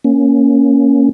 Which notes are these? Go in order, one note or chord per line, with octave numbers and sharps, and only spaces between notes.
A#3 C#4